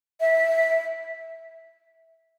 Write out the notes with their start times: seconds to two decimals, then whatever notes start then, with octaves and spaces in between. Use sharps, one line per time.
0.20 E5